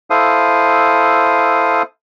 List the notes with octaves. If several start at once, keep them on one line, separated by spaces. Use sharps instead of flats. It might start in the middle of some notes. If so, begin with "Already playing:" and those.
E4 A4 C5 F5 D#6